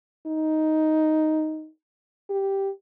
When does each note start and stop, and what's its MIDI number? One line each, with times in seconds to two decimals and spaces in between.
0.26 1.68 63
2.30 2.69 67